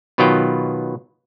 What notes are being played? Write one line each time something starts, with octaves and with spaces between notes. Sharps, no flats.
B2 D#3 F#3 B3 F4 G5